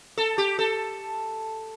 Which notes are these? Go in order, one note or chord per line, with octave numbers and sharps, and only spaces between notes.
A4
G4
A4